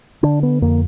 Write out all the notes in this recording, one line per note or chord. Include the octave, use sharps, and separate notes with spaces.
D3 D4
B3
F2 A#3